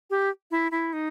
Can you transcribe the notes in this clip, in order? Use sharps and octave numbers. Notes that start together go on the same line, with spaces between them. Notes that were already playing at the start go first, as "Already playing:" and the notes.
G4
E4
E4
D#4